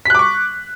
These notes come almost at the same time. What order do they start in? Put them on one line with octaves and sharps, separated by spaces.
B6 F#6 D6 C#6